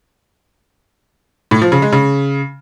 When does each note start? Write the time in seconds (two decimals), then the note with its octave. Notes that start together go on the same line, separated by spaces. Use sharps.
1.51 A2
1.62 F3
1.72 C#3
1.82 G#3
1.92 C#3